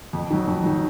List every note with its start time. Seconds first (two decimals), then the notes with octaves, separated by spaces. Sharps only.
0.13 F2
0.30 D#3 F#3
0.47 F2
0.64 D#3 F#3